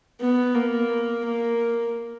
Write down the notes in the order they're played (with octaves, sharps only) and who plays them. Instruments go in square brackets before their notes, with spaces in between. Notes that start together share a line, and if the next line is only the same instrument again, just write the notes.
[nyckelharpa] B3
A#3
A#3